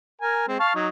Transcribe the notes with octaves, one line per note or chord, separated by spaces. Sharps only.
A#4 G#5
G#3 C4
F5 A5 C#6
F#3 D#4